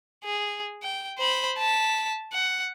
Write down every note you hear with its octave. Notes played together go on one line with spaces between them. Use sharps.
G#4
G5
C5 B5
A5 B6
F#5